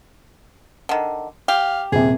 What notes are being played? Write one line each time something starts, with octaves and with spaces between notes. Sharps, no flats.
D3 D#3
G4 F5
D#1 C3 G#4